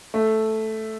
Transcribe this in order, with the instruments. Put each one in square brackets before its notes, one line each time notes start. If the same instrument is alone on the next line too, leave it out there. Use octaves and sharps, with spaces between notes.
[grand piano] A3